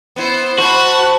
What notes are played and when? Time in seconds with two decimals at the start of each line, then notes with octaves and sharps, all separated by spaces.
0.16 B3 E4 C5
0.58 F#4 C5 A5 B5